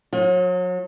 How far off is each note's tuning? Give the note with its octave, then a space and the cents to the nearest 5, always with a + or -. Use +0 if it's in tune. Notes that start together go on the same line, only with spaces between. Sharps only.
F#3 -35 F4 +35